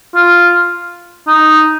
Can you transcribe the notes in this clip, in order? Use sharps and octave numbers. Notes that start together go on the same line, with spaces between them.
F4
D#4